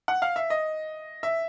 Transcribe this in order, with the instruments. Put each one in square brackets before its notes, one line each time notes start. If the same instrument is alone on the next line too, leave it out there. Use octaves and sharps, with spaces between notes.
[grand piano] F#5
F5
E5
D#5
E5